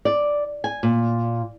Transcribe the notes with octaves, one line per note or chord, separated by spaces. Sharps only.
D5
G#5
A#2